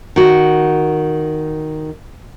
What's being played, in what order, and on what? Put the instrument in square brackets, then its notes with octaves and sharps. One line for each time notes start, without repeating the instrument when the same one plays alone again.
[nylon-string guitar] D#3 F#4